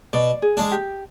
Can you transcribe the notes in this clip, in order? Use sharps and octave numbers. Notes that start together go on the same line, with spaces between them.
B2 D5
G#4
G#3 D4
G4